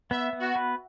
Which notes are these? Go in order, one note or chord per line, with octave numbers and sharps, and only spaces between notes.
B3 E5
B3
F#4
B4